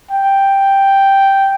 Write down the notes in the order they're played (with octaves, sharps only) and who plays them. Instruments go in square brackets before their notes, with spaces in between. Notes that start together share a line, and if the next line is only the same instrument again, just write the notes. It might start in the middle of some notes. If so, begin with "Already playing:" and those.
[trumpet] G5